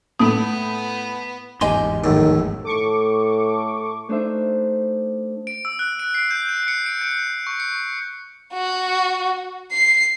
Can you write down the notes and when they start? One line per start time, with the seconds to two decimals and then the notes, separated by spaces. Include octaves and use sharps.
0.19 A2 B3 D#6
1.61 G1 E2 G#2 G4 D#5 G#5 C6
2.04 A#1 F#2 A2 D#3
2.65 A2 A4 C#6 D6
4.09 A3 D4 D#4 C5 E5
5.47 D7
5.65 E6
5.79 F#6
6.00 D7
6.14 C7
6.31 G6
6.49 D7
6.68 C#7
6.86 D7
7.01 G6
7.47 C#6
7.60 C#7
8.54 F#4
9.72 C7